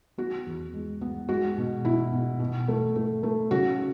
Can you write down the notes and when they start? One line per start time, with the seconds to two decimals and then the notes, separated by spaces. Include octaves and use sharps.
0.18 B3 F#4
0.46 E2
0.73 G#3
1.01 B3
1.29 G#3 F#4
1.58 B2
1.84 B2 E4
2.13 B2
2.40 B2
2.68 A3
2.96 A3
3.23 A3
3.51 C#3 F#4